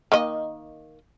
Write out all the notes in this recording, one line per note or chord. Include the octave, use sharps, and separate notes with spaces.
D#3 A#3 D#5